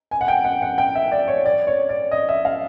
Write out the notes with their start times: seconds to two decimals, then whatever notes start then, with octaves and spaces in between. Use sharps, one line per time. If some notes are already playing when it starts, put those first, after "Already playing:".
0.11 G#5
0.21 F#5
0.28 G5
0.44 F#5
0.62 F#5
0.78 G5
0.95 E5
1.12 D5
1.28 C#5
1.46 D5
1.67 C#5
1.89 D5
2.11 D#5
2.29 E5
2.45 F5